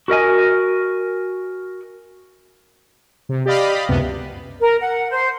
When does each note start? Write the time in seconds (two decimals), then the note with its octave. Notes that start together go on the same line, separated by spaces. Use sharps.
0.08 F#4 A#4 D#5 G#5
3.29 C3
3.46 G4 D5 D#5 F5 B5
3.89 C#2 F#2 C3 B3
4.61 A#4
4.81 F#5
5.10 C5